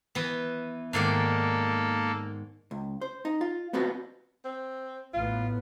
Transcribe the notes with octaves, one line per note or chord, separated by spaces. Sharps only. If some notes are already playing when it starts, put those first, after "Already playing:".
E3 B3
G#2 D#3 A#3 A4 D5
C#2
C5
D#4
F4
B3 C4 F4 F#4 B4
C4
A1 A2 B3 F4